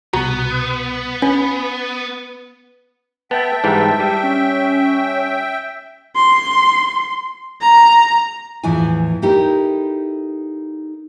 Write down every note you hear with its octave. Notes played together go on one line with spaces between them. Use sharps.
C2 B2 B3 F#4 A#5
C#4 B4
B3 E5 G5 A5
G#2 E3 G3
G3
C#4
C6
A#5
E2 A2 E3 F3 E4 G#5
D#4 E4 G4 A4 A#4